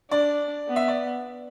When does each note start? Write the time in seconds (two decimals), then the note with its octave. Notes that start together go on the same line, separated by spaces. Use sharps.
0.11 D4 D5
0.69 B3
0.76 E5
0.88 D5